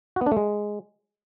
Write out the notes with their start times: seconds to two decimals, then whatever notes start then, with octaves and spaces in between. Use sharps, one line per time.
0.16 F#4
0.21 B3
0.26 D4
0.32 A3
0.37 G#3